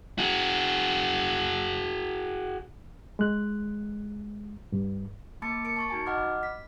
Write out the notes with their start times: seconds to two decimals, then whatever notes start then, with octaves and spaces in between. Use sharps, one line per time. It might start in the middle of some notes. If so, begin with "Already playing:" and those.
0.18 F#4 G#4
3.19 G#3 F#6
4.72 G2
5.42 A#3 A5 B5 D6 A6 C#7
5.64 A#4 C#7 D7
5.76 A5 C#6 A6
5.89 D#4 F#4 G#5 A#5
6.06 D#5 F#5 B5 D6 F6
6.43 B6